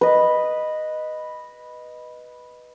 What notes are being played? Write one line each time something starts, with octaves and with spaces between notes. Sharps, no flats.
B4 D#5